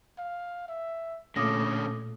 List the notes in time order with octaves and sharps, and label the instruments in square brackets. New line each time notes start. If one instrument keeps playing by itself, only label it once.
[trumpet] F5
E5
[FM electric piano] A#2 A3 [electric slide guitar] D3 C#4 [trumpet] A4 [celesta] D6 D#6 A#6